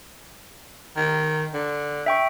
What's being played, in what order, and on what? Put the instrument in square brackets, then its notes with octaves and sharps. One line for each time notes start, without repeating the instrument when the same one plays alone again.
[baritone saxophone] D#3
D3
[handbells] E5 G5 C#6